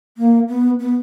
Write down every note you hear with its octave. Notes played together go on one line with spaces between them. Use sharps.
A#3
B3
B3